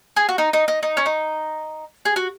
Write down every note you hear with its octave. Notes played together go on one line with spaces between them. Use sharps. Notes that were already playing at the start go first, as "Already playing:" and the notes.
G#4
F#4
D#4
D#4
D#4
D#4
C#4
D#4
G#4
F#4